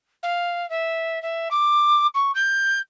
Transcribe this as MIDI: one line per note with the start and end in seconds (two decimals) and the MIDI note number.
0.23 0.68 77
0.70 1.21 76
1.22 1.49 76
1.51 2.07 86
2.14 2.31 85
2.35 2.79 91